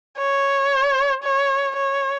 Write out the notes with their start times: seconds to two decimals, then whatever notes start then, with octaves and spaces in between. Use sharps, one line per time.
0.17 C#5
1.24 C#5
1.76 C#5